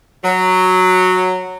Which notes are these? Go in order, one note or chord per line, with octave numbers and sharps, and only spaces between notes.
F#3